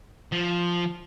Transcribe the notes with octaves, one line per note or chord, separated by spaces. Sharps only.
F3